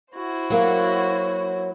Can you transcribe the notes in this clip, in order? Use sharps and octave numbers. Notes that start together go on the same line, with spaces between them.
E4 F#4 C5
F#3 A#3